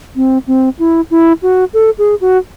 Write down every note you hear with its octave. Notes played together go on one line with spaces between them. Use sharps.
C4
C4
E4
E4
F#4
A4
G#4
F#4